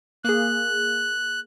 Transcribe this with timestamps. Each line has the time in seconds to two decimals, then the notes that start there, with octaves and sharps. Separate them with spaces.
0.24 A#3 G#4 F#6